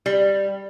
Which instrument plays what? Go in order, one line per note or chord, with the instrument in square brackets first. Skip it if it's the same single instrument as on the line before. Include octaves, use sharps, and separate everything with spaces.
[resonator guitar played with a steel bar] G3